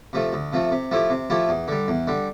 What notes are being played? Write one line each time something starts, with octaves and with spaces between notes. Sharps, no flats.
C3 F3 A3
D2
C3 F3 A3
C3
F3 A3 E4 G4
C3
F3 A3 E4 G4
E2
D3 G3
E2
D3 G3